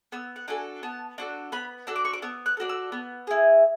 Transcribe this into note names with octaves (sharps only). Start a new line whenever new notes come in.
B3 E6
F#5
D4 F#4 A4 G#5
B3 A5
D4 F#4 A4
B3 B5
D4 F#4 A4 E6
D6
C#6
D6
B3 E6
F#6
D4 F#4 A4
E6
B3
E4 G#4